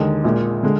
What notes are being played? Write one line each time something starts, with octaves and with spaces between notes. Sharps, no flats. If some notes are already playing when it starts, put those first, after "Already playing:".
Already playing: D#2 D3 G#3 D#4
A#1 A#2 G#3
D3 G#3